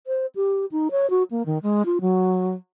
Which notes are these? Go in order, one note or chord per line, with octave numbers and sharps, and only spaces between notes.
C5
G4
D#4
C#5
F#4
A#3
D#3
G#3
F4
F#3